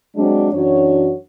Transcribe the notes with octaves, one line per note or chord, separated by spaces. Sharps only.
F#3 G#3 C4 D4
F#2 E3 D4 F#4 C#5